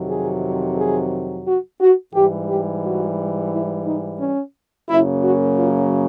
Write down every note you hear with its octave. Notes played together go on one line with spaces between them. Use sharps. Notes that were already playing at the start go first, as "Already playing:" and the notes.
Already playing: F2 C3 D#3 F#3
G#4
G#4
F#4
F#4
G#2 E3 G3 G4
G4
F#4
E4
D#4
C#4
F#2 C#3 F#3 A#3 E4
F#4
F4